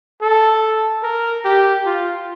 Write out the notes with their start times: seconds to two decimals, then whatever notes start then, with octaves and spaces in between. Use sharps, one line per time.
0.22 A4
1.03 A#4
1.45 G4
1.86 F4